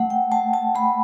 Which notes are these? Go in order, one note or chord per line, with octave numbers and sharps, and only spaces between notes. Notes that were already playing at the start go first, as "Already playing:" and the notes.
Already playing: A3 F#5
G5
A3 A5
A5
A3 B5